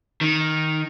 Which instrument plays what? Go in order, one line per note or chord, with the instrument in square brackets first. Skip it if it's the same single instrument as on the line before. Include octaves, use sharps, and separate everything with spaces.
[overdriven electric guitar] D#3